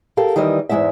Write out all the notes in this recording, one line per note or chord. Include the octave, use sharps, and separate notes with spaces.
G4 A4 A#4 F5
D#3 E3 G3 E4 D#5
E2 G#2 D#3 G#3 E4 E5